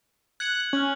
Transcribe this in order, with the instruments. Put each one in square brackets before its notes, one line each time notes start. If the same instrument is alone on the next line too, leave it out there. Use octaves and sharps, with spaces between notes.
[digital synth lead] F#6 [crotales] G#6 C#7 F#7
[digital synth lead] C#4 [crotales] F6 F#6 F#7